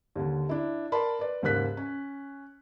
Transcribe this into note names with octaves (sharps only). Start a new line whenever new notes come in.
D#2 D3
D4 E4
A#4 D5 A5 B5 C6
B4 D5
D#2 G#2 C#3 A#4 F#6 B6
C#4